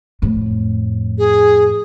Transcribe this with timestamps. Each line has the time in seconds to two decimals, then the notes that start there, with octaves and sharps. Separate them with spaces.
0.22 F2 A2
1.19 G#4